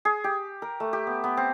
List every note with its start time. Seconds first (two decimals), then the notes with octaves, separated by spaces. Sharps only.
0.05 G#4
0.24 G4
0.62 A#4
0.80 A3
0.93 G4
1.07 B3
1.24 B3
1.37 C4